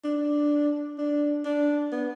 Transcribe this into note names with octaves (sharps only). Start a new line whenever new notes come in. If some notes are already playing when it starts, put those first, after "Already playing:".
D4
D4
D4
B3